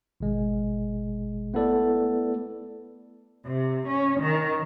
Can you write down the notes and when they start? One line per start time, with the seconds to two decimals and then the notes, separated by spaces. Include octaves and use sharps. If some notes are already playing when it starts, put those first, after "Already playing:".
0.20 G#1 B2 G#3
1.54 A3 B3 E4 A4 B4 D5
3.46 C3
3.88 C#4
4.20 D#3